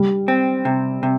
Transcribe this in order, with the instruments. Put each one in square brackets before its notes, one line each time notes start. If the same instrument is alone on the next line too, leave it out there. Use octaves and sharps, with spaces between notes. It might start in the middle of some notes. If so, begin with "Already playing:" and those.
Already playing: [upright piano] G3
[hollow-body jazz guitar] C4
C3
C3